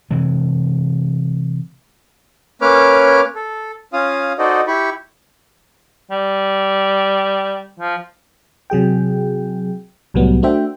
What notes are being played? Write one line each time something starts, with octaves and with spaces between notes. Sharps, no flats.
C3 E3 G#3
A#3 C#4 B4 C#5 D6 F6
A4
C#4 F4 F5 D#6
D#4 F#4 A4 C5 D5 D#5
E4 G4 B5 C#6
G3
F3
C3 F#3 G#4 G5
C2 A2 F#3 G3 B3
A3 D4 F#4 C5 E5 G5